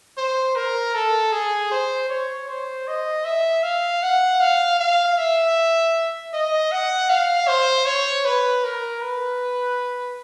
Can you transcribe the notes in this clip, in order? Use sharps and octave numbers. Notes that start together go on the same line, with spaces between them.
C5
A#4
A4
G#4
C5
C#5
C5
D#5
E5
F5
F#5
F5
F5
E5
D#5
F#5
F5
C5
C#5
B4
A#4
B4